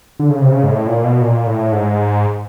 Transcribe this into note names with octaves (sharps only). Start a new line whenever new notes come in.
D3
C#3
C3
C#3
G#2
A2
A#2
B2
A#2
A2
G#2